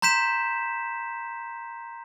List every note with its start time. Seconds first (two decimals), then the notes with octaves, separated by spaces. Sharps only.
0.02 A#5 C6 G6 B6 E7